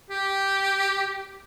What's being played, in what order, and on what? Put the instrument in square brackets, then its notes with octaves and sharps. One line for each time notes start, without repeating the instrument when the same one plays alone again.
[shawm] G4